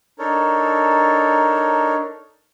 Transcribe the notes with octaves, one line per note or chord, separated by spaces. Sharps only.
D4 D#4 A4 A#4 C#5